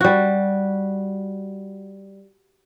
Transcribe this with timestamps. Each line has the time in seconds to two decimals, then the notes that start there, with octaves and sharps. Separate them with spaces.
0.01 G3 F#4